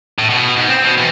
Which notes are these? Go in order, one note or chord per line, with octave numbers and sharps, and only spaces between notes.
A2
B2
G#2
C4
B2
E2